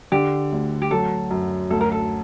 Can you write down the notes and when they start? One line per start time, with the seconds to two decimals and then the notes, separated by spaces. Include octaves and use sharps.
0.12 D3 G4
0.52 D2
0.82 G4
0.91 F#3 A4
1.31 F#2
1.70 D2 A4
1.81 A#4
1.92 A4